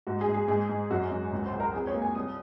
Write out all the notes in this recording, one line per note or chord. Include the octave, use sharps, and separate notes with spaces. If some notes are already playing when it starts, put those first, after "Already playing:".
G#2 F#4
G#4
G#2
G#4
G#2 G#4
G#2
F#2 F#4
F#2
C#2
C5
C#2
A#4
F2 G#4
C#5
A#3
G#5
C2 D#6